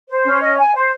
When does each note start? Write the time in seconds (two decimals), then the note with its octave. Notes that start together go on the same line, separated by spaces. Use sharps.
0.10 C5
0.26 C#4
0.41 D#5
0.58 G#5
0.74 C5